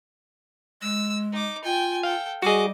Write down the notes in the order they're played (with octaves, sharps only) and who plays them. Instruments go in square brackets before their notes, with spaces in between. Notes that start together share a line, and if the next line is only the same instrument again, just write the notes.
[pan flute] G#3 [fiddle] E6
[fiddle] D#4 D6
[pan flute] F4 [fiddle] G5 G#5
[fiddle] A4 G5 [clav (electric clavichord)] F5
[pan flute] G3 [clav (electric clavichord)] F#4 G#4 [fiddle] D#5 D6